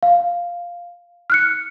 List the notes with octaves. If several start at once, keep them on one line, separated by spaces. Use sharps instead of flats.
F5
F6 F#6 C#7